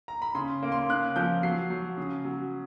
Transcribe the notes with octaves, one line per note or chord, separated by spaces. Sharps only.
A#5
B5
C#3 C6
A#3
C6
C#3 F#6
F3 G6
F#3 C7
F#3
C#3
F#3